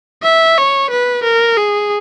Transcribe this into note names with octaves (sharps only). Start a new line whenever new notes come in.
E5
C#5
B4
A#4
G#4